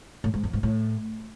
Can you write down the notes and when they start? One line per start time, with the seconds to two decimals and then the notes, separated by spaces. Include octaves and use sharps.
0.24 A2
0.34 G#2
0.44 F2
0.53 G#2
0.63 A2